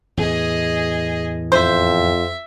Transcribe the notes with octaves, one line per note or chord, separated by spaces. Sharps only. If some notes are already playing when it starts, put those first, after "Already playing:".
E2 A2 E3 G#4 D#5
F2 C5 E5